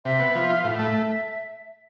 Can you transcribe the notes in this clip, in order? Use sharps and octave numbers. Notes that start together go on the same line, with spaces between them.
C3 E5
B3
F3
F4
A2 E5 F5
A3